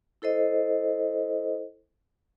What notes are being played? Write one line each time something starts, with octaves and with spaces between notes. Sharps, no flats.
E4 A4 C5 D#5